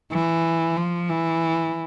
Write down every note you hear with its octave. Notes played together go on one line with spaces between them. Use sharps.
E3
F3
E3